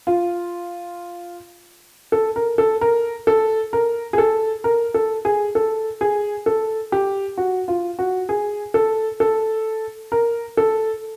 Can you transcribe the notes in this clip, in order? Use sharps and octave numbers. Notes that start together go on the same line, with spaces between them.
F4
A4
A#4
A4
A#4
A4
A#4
G#4
A4
A#4
A4
G#4
A4
G#4
A4
G4
F#4
F4
F#4
G#4
A4
A4
A#4
A4